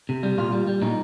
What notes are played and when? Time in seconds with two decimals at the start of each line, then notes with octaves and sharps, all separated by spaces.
0.09 C3
0.23 G3
0.38 A#2 F4
0.52 G3
0.67 G3
0.82 A#2 D#4